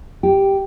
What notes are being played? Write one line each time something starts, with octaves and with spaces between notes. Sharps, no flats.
G4